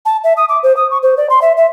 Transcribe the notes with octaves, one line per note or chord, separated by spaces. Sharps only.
A5
E5
D#6
D6
C5
D#6
C#6
C5
D5
C6
E5
E5